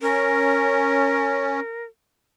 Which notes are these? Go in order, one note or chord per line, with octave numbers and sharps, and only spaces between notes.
C#4 A#4